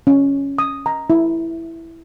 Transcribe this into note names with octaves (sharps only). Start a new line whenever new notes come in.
C#4
D#6
A#5
E4